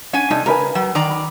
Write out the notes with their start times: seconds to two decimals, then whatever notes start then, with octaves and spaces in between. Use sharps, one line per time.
0.13 C#4 F#5 G#5
0.31 C3 D4 D#4 A4
0.46 C#3 A#4 B4 G#5
0.75 F#3
0.95 D#3 D5 A#5
1.10 B5